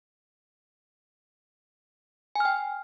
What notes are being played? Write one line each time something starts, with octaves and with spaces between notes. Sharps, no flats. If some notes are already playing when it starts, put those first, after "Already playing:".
G5 G#5 F6